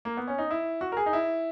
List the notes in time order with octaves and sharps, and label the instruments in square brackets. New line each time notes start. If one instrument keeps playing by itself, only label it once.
[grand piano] A#3
B3
C#4
D#4
E4
F#4
A#4
G#4
D#4
E4